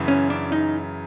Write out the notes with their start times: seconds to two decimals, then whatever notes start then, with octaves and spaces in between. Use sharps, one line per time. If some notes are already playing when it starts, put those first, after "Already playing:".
Already playing: F#2 C#3 E3
0.08 C#4
0.30 D4
0.52 D#4